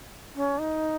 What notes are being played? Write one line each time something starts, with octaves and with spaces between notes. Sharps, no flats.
C#4
D#4